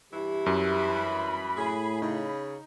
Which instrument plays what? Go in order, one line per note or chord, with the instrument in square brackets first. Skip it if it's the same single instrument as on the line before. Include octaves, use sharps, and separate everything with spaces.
[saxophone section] G2 E3 E4 [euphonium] G4
[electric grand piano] F#2 [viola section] B5
[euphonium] A2 [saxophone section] G#4
[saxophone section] C#3 [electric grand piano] D#4